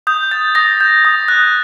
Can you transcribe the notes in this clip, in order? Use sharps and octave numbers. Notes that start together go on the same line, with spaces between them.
D#6 G6
G6 A6
D#6 A#6
G6
D#6
F#6